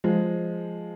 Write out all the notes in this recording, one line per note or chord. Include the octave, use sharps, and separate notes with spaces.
F3 G#3